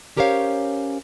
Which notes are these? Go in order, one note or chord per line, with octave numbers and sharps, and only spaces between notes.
C#4 G4 A#4 C5 C#5 F5